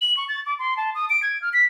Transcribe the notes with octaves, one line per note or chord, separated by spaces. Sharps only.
F#7
C#6
A6
D6
C6
A5
D#6
D7
G#6
F6
B6